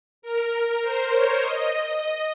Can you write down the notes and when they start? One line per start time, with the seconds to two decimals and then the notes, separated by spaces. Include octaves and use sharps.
0.22 A#4
0.81 C5
1.11 C#5
1.40 D#5